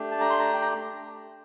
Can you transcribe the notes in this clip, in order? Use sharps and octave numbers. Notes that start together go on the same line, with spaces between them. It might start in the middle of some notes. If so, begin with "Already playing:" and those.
Already playing: A3 D4 G4
A5
A#5
C6
A#5
G5
A#5